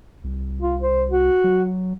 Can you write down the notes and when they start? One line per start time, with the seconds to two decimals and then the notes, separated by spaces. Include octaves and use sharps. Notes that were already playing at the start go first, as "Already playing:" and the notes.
0.24 C2
0.61 F4
0.81 C5
1.11 F#4
1.44 F#3